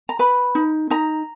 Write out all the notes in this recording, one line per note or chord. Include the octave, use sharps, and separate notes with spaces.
A#5
B4 B5
D#4
D#4 A#5